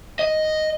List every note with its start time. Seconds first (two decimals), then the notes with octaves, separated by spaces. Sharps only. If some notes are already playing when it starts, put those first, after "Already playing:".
0.19 D#5